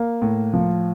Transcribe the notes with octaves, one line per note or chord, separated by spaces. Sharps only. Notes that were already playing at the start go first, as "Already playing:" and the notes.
Already playing: A#3
A2
F3